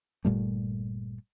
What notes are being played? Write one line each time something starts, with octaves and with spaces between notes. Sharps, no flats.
G1 A#2 G3 A3